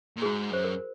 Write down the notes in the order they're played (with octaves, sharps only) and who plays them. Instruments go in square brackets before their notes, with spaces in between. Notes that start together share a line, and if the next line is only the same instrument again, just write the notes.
[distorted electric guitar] A#2
[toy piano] G#4
[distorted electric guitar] G#2 [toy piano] F#4
[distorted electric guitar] F#2 [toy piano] C5
[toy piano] A#4